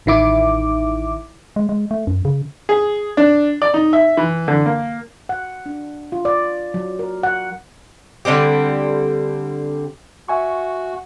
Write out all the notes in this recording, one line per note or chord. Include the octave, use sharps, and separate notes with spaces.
A1 D#3 E4 D6
G#3
G#3
A3
F#2
C#3
G#4
D4
D5
D#4
E5
E3
D3
A#3
F#5
D4
F4
D5
F#3
A#4
F#5
D3 G3 C4 G4
F#4 E5 G#5 C#6